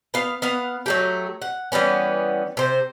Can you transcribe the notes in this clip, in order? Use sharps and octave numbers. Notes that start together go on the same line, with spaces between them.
B3 F5
B3 F5 F#5
F#3 A3 G4
F#5
E3 G3 B3 C#4
C3 C5